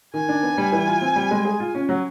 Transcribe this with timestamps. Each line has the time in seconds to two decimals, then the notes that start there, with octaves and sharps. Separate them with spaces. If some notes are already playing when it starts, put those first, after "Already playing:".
0.14 D#3 G#5
0.29 D4
0.43 B3
0.58 G3
0.72 E3
0.87 F4
1.01 C4
1.16 G3
1.31 G#3
1.45 G#4
1.60 F4
1.75 C#4
1.89 F#3